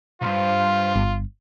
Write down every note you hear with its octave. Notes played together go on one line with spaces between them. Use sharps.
B1 G2 F4 C5 F5
G1